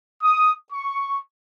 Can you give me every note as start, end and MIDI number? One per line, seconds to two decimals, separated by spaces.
0.22 0.53 87
0.71 1.18 85